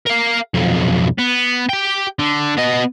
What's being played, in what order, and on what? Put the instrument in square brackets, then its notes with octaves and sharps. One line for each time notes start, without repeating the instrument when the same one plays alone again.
[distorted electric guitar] A#4 F5
B1 F2
B3
G4 G5
D3
B3 D#5